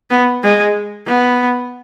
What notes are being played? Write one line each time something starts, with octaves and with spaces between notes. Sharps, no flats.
B3
G#3
B3